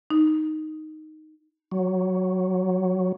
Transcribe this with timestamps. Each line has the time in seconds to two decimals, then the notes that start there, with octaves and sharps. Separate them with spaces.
0.11 D#4
1.72 F#3